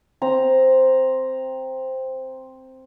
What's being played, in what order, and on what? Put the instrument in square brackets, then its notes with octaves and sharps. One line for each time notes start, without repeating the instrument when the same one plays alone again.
[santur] C4 A#5